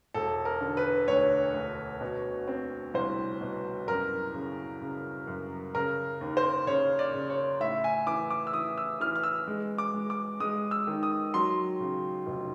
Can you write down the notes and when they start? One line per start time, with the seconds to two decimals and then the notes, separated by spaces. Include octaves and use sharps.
0.14 E1 A4
0.45 A#4
0.61 D3
0.77 B4
1.08 D2 C#5
1.54 D2
2.01 B2
2.48 C4
2.94 C2 C5
3.41 B2
3.87 F#2 A#4
4.34 C#3
4.82 C#3
5.27 F#2
5.75 C#3 A#4
6.21 D#2
6.37 C5
6.67 C#3 C#5
6.99 D5
7.14 C#3
7.30 C#5
7.60 A2 E5
7.84 G#5
8.07 E3 D6
8.30 D6
8.47 E6
8.53 E3 D#6
8.78 E6
9.00 E3 F6
9.16 F6
9.23 E6
9.48 G#3
9.78 D6
9.94 G#3
10.10 D6
10.40 G#3 D#6
10.71 E6
10.87 D#3
11.03 D#6
11.34 F#3 C6
11.80 C#3
12.27 F1